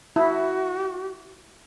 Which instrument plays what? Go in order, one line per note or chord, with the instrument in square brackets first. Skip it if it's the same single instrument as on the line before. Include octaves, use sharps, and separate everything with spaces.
[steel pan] E4 [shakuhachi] F#4